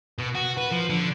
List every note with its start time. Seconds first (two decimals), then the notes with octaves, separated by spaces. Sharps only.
0.18 B2
0.35 F#4
0.58 B4
0.72 F3
0.90 D3